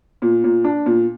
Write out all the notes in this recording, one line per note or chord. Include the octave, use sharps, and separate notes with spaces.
A#2
A#2
D4
A#2